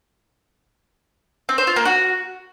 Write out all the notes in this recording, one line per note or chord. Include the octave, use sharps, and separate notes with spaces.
C4
C5
F4
A#3
F#4